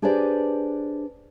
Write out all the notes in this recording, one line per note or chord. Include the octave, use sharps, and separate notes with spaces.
D4 G4 G#4 B4 C5 D5